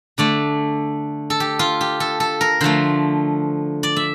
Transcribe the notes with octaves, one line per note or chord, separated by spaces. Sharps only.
D3 A3 D5
A4
G4
F4
G4
A4
A4
A#4
D3 F3 A3 C5
D5
E5